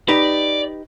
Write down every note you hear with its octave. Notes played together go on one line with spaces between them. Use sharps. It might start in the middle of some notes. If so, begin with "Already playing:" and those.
D#4 G4 B4 D5